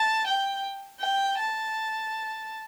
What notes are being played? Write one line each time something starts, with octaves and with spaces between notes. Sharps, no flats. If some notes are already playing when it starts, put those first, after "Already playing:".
Already playing: A5
G5
G5
A5